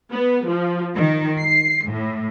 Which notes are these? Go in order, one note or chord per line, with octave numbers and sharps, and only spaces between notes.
B3
F3
D#3
C7
A2